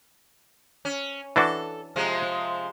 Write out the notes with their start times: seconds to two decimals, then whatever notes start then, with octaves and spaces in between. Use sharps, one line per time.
0.85 C#4
1.36 E3 D4 F#4 A4
1.96 C3 F3 G#3